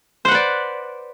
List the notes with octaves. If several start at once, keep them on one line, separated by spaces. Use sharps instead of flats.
B4 C5 D5 F#5